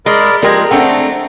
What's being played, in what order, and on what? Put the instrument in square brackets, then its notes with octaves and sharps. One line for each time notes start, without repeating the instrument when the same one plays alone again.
[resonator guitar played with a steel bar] G#3 [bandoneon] A#4 D5 B5
[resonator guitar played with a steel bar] F3 G#3 [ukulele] G4 A#4 D5 [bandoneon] A#5
[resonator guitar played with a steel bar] A3 C4 D4 [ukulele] F#5